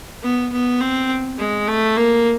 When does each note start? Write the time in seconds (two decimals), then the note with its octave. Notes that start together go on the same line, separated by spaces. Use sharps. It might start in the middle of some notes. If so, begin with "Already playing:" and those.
0.22 B3
0.52 B3
0.81 C4
1.38 G#3
1.68 A3
1.97 A#3